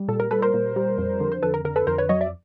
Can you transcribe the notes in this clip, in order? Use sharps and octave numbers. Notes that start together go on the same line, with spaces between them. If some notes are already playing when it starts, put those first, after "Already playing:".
Already playing: G3
A#2 A4
A#4
G3 A4 B4
A#4 C5
A#2
G3
F2
D3
C5
F2 A4 B4
A#4
D3 A#4
A4 B4
F2 A#4 C5
B4 C#5
F#3 C#5 D#5
D5 E5